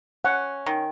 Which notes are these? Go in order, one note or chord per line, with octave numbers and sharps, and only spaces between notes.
C#4 F#5
D#3